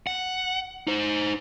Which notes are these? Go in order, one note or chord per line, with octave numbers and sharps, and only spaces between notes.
F#5
D#4 C5